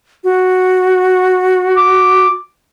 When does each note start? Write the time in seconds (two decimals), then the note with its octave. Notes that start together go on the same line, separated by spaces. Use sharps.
0.24 F#4
1.77 D6